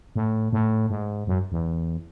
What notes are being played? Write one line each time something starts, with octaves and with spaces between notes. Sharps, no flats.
A2
A2
G#2
F#2
E2